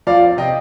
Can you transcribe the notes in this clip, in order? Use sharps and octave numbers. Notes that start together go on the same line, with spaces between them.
F3 D5 F5
C4
C3 D#5 G5